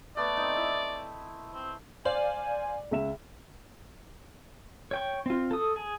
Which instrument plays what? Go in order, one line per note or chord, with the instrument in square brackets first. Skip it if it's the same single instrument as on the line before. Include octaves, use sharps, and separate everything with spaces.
[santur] A3 B3 [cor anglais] D5
[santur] C4 D#4
E4 D#6
[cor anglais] C4
[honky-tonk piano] C5 F5 [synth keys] D5 [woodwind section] G#5
[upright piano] C#2 E5 E7
[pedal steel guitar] C#5 G5 C#6
C4 F4
A4 D#6
G#4